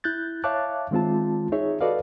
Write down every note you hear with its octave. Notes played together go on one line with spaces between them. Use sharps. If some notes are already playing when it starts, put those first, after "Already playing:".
E4 F#6 G6 A6
C#5 E5 F5 A5 D6 F#6
D#3 G#3 C4 F4 A5
D#4 G#4 C#5 E5
F#4 A4 B4 D5 D#5 F5